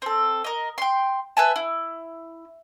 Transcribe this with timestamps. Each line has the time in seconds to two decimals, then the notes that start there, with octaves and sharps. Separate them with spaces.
0.02 C4 A4
0.44 A#4 D#5
0.78 G5 C6
1.37 B4 E5 G#5 A5
1.56 E4